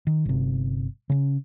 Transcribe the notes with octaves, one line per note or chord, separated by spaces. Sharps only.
D#3
G1 C3
C#3 C#4